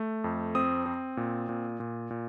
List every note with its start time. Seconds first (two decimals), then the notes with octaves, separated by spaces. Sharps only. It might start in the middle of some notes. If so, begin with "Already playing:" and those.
Already playing: A3
0.24 F2
0.55 C4 D#6
0.86 C4
1.17 A#2
1.49 A#2
1.80 A#2
2.11 A#2